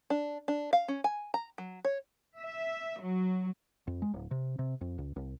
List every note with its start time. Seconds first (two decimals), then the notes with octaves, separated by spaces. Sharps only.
0.10 D4
0.48 D4
0.73 F5
0.88 C#4
1.04 G#5
1.34 A#5
1.58 F#3
1.85 C#5
2.39 E5
3.01 F#3
3.87 F2
4.02 G#3
4.14 D1
4.31 C3
4.59 C3
4.81 F2
4.98 C#2
5.16 C2